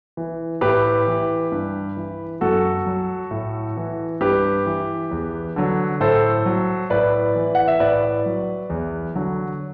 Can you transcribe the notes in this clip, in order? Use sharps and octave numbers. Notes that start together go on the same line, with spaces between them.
E3
A2 G4 B4
E3
G2
E3
F#2 F#4 A4
F#3
A2
E3
G2 G4 B4
E3
E2
D3 F#3
A2 A4 C5
F#3
A2 B4 D5
E3
F#5
E5
A2 B4 D5
F#3
E2
D3 F#3